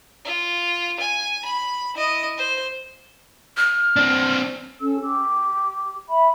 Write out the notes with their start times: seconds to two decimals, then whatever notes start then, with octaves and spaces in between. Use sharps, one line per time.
0.25 F4
1.00 G#5
1.45 B5
1.95 E4 D#5
2.37 C5
3.57 F6
3.96 C4 D4
4.78 C#4 A4 E6
5.00 G4
6.08 E5 B5